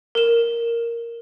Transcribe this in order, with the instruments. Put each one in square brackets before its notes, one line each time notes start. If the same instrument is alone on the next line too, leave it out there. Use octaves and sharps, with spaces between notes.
[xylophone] A#4 E7